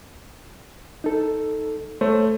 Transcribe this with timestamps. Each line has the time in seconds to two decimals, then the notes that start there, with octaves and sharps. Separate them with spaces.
1.04 D#4 A4
2.01 A3 C5 C#5